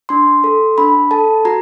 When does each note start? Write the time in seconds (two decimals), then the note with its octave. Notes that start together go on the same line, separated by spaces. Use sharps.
0.09 D4 C6
0.44 A4
0.78 D4 B5
1.11 A4 A5
1.45 F#4 A#5